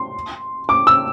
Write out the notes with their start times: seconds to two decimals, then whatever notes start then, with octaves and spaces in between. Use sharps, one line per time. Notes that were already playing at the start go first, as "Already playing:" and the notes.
Already playing: C6
0.69 D6
0.87 E6